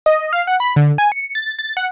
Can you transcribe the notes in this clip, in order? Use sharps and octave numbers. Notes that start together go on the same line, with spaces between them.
D#5
F5
F#5
B5
D3
G#5
C#7
A6
A6
F#5